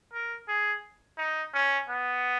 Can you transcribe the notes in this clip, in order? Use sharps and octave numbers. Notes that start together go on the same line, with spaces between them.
A#4
G#4
D#4
C#4
B3